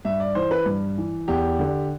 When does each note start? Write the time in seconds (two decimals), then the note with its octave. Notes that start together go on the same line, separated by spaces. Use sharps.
0.05 G2 E5
0.20 D5
0.35 E3 C5
0.51 B4
0.66 G2
0.98 E3
1.28 E2 G4
1.59 D3